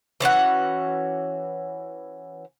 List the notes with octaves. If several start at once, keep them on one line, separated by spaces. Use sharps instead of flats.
E3 C#4 F#4 F#5